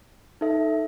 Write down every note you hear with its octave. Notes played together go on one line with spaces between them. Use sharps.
D#4 A4 E5